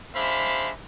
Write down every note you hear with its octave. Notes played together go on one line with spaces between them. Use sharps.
G#3 D4 C5 E5 F5 B5